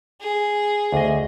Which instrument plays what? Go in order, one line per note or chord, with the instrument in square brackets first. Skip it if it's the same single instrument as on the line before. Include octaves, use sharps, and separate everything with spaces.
[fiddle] G#4
[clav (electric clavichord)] D2 D#5